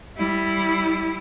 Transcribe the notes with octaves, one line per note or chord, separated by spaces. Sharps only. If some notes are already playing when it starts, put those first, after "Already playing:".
G3 E4